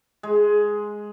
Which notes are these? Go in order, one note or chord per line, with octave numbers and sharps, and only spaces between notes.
G#3